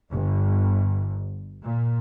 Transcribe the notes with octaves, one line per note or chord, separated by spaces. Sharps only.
G1
A#2